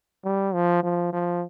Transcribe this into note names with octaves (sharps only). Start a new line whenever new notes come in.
G3
F3
F3
F3